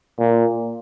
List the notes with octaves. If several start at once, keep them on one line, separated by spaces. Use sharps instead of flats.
A#2